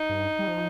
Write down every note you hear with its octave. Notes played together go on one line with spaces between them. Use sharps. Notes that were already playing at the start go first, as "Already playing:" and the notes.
Already playing: D#4
G2
G3
F3